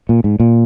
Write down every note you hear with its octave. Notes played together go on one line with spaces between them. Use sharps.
A#2
G#2
A#2